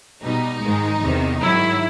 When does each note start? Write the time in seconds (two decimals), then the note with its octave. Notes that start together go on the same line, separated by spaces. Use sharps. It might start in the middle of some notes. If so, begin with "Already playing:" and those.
0.23 B2 G3 D#4
0.62 G#2 D#3 G#3
1.01 E2 C3 D#3
1.42 G#2 D#3 F#3 E4